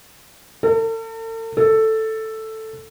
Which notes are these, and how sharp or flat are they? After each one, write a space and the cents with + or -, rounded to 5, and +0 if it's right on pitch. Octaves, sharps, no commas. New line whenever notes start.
A4 +45
A4 +5